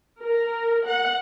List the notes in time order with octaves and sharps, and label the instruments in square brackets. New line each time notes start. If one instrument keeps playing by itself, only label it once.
[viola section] A#4
F#5